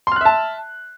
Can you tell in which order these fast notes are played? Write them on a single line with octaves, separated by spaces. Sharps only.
C6 F6 F#6 E5 A5